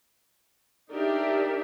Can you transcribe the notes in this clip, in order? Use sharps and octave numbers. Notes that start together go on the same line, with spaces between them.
D4 D#4 G4 A#4 D5 E5